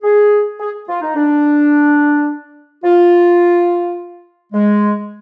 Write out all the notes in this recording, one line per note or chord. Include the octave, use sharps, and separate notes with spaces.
G#4
G#4
F4
D#4
D4
F4
G#3